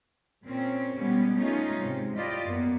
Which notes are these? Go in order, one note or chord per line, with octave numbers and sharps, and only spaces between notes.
A#2 C4 C#4
B2 G3 G#3 B3 C#4 G4
G#3 A3 C#4 D#4 F4
G#2 C3 G#3
E4 F4 G4 D5 D#5
F#2 A#3 B3